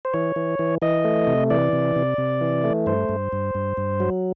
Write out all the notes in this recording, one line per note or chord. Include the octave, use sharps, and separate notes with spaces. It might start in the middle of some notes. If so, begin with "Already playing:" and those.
C5
E3 C#5
E3
E3
E3 D#5
A3
C3
E3 D5
C3
C3
C3
E3
A3
G2 C5
G2
G2
G2
G2
F#3